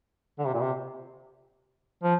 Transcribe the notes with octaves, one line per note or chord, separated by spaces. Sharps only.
D3
C3
A#2
C3
F3